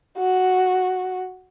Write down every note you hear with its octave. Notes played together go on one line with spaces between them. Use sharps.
F#4